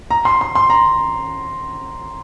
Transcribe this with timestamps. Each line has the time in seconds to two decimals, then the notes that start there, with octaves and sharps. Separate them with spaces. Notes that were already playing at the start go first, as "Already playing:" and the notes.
0.11 A#5
0.25 C6
0.41 C6
0.55 C6
0.70 A#5